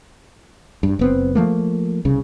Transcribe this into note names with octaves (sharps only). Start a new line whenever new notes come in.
G2
F#1 B3 C4
F3 A3 A#3
C2 C#3